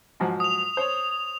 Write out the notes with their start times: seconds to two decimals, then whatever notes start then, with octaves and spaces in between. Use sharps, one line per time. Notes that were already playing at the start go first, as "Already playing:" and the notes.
0.20 G#2 F3 F#3
0.40 D#6 F7
0.77 C5 C#5